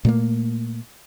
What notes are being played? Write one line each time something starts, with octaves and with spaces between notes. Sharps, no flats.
A#2 A3 A#3